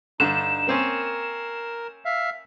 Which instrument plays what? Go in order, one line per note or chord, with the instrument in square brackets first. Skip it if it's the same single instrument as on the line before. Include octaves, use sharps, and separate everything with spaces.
[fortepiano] G2 D3 [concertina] D#4 [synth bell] E7
[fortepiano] A#3 C4 C#4 [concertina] A#4
[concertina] E5 F5